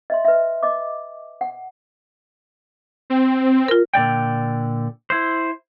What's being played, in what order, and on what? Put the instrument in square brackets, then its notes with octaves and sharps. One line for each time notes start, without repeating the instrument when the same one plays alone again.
[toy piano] D#5 E5 C6
B4 E5
D#5 D6
F#5
[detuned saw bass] C4
[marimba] F4 A#4
[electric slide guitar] A#2 D3 D5 G5
E4 C5